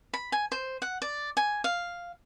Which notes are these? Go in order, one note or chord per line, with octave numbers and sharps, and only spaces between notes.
B5
G#5
C5
F#5
D5
G#5
F5